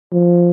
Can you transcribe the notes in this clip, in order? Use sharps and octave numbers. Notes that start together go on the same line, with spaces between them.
F3